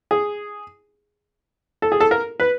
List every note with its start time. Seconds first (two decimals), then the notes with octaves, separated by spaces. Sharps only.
0.11 G#4
1.82 A4
1.92 G#4
2.00 A4
2.11 A#4
2.40 B4